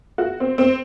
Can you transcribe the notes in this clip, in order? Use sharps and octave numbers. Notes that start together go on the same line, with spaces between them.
F#4
C4
C4